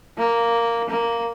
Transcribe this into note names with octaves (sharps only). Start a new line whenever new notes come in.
A#3
A#3